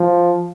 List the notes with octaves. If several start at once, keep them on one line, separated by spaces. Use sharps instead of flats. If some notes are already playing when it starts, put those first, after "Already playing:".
Already playing: F3